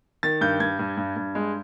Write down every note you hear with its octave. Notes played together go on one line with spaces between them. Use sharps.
D#3 A6
G2 G6
G2 G#6
G2
G2
G2
G#3